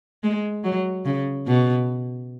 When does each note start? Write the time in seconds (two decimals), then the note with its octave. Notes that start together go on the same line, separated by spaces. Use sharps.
0.23 G#3
0.64 F#3
1.05 C#3
1.47 B2